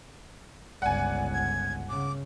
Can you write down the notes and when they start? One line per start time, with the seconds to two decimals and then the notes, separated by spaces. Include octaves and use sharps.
0.82 G1 C#2 D5 F#5 G#5
1.33 G#6
1.89 C#3 D6